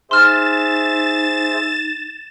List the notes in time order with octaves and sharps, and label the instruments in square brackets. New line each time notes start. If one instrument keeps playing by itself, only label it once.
[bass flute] D#4 [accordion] G#4 C5 E5 [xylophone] C6 F6 [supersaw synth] A6 E7